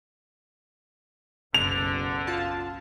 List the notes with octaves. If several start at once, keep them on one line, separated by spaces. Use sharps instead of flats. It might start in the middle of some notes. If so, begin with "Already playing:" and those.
F#1 B1 D3 F7
F4 A5